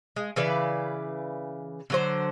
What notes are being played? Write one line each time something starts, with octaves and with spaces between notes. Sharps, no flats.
G#3
C#3 E3 B4 D5
D3 F#3 C5